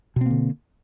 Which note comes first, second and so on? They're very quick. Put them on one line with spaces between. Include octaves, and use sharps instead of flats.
B2 C4 A#3 D3